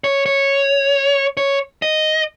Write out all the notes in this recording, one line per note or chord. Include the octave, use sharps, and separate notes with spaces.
C#5
C#5
C#5
D#5